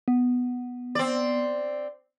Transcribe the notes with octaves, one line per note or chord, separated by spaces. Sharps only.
B3
C4 D5